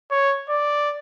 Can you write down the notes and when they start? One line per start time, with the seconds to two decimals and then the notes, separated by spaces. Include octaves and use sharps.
0.11 C#5
0.49 D5